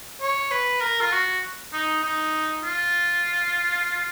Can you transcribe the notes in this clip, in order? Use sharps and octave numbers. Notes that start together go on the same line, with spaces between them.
C#5
B4
A#4
F4
F#4
D#4
D#4
F4